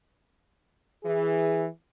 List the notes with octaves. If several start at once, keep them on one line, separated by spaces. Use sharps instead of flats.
E3 G#4